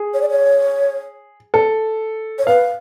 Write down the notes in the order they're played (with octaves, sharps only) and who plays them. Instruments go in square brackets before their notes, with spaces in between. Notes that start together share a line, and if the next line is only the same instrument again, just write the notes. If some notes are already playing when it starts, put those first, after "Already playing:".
Already playing: [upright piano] G#4
[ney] C#5
D5
C#5
[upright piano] A4
[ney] C#5
[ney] B4 [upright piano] F5